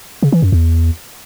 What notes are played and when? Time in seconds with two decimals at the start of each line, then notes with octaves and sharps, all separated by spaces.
0.23 C#3
0.32 E3
0.42 F#2
0.52 E2